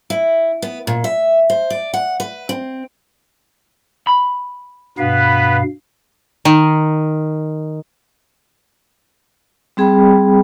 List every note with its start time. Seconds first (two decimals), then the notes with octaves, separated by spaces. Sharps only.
0.10 E4
0.62 B3
0.87 A#2
1.04 E5
1.50 C5
1.70 D5
1.94 F#5
2.20 B4
2.49 C4
4.07 B5
4.98 G2 B2 B3 B4 F5
6.45 D#3
9.77 G3 C4 G#4 G5 B5